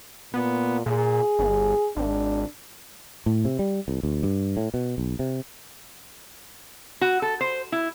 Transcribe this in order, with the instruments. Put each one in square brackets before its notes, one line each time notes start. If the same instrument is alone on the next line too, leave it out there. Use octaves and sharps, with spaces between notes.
[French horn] A#2 [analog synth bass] B3
[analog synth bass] A#2 [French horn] G#4
[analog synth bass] G1
[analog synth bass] G#1 [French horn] D4
[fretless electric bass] A2
C3
G3
C2
D2
G2
A2
B2
B1
C3
[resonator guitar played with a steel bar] F#4
A4
C5
E4